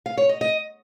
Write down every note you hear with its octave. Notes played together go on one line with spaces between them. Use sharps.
F5
C#5
D#5
D#5